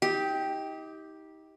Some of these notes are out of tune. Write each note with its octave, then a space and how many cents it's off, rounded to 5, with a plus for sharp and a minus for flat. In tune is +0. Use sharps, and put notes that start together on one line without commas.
D#4 +35 G4 +0